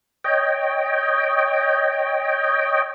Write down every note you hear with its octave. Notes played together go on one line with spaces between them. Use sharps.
C#5 D#5 G5